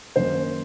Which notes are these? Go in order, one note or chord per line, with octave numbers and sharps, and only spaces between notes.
F#2 D#3 A#3 C5